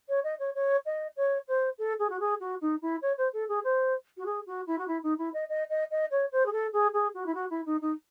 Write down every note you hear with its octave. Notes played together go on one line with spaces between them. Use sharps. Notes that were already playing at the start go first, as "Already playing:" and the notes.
C#5
D#5
C#5
C#5
D#5
C#5
C5
A4
G#4
F#4
G#4
F#4
D#4
E4
C#5
C5
A4
G#4
C5
F#4
G#4
F#4
E4
F#4
E4
D#4
E4
D#5
D#5
D#5
D#5
C#5
C5
G#4
A4
G#4
G#4
F#4
E4
F#4
E4
D#4
D#4